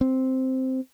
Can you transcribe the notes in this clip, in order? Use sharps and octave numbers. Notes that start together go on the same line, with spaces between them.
C4